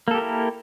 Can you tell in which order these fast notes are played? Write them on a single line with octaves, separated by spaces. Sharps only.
A#3 A4 G4 A#4 E4